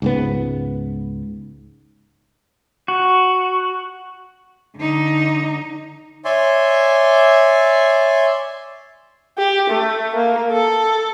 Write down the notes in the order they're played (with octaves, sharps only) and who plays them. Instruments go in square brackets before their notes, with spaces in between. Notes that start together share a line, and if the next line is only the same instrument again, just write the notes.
[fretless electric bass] C#2 G#2 B3
[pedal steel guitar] F#4
[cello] D3 D#4
[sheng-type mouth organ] C#5 D5 E5 G#5 C6
[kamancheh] G4
A3
A#3
A4